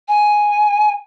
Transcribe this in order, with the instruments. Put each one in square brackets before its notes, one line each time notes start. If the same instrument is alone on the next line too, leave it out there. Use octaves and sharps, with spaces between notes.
[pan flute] G#5